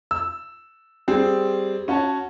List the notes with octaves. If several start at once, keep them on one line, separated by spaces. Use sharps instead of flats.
E6
G3 C4 G#4
C#4 F#4 C#5 A5